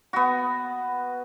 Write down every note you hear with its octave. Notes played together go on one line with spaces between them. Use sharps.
B3 F#4